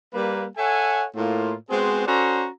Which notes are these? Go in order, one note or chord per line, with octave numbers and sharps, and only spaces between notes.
G3 A#3 B4
A4 C#5 E5 F#5 G#5
A2 A#3 F4
G#3 B3 C4 F#4 G#4 C5
C#4 F#4 A4 C5 D5 A#5